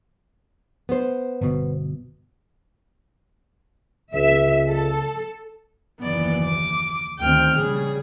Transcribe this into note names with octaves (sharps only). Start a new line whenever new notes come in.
B3 C5
G1 B2
C#2 E5
A4
F#1 D#2 E3 B3 D5
D6
D2 D#3 C4 G5 F6
A#1 C#3 G3 G#4